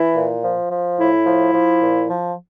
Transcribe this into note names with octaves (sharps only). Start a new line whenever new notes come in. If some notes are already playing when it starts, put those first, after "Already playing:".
Already playing: E3 E4
A#2
F3
F3
A2 E4
F3
F3
A#2
F3